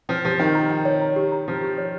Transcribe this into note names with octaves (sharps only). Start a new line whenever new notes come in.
F3 G5
F3 G4
D#3 G5
A#5
G5
C#5
A#5
G4
A#5
F3 G4
G4
C#5